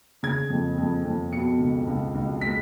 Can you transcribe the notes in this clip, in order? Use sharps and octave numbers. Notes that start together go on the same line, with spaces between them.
C#3 G#6
F2
F2
F2
B2 C#7
C#2
C#2
C#2
G#3 B6